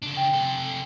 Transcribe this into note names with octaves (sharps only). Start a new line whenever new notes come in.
C#3 D4
G5
C3 A4